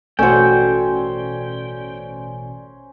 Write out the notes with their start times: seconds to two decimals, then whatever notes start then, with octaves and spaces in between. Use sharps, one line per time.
0.19 A1 B2 A3 C#4 F#4 C5 D5 G5